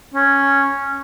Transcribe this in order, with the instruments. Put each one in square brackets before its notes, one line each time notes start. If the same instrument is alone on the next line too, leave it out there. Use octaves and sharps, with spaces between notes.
[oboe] C#4